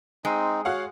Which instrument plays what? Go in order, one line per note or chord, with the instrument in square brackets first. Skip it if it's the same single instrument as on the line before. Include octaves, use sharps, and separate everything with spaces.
[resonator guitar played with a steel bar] G#3 G#4 [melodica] C4 D#4
[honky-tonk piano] F#4 F5 F#5 [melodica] C#5